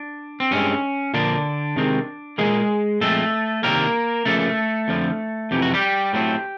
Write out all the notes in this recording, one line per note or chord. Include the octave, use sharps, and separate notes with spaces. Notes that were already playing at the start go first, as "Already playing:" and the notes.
Already playing: D4
C4
G2 E3 G#3 C4 C#4
A#2 D3 F3 A#3 D4
C3 D#3 G#3 C4
A#2 F3 G#3 A#3 G#4
A#2 F3 G#3 A3 C4 A4
C3 D#3 G3 A#3 C4 A#4
C#3 F3 A3 A#3 A4
F2 D3 F3
F2 C3 E3 G4
F#4
G3 G4
A2 F#3 A3 C4